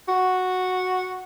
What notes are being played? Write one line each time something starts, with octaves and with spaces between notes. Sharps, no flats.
F#4